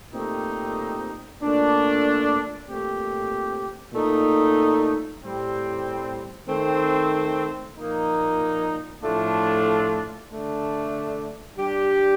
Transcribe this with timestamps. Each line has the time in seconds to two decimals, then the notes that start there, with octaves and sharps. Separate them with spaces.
0.12 A#2 A3 C4 D#4 G4
1.39 A#2 A3 D4
2.67 A#2 A3 C4 G4
3.94 A#2 A3 D#4
5.21 A2 G3 C4 G4
6.48 D#3 A3 C4
7.76 A#2 F3 A#3 D#4
9.02 A2 F3 A3 D4 F4
10.30 D3 A3 D4
11.57 G3 D4 G4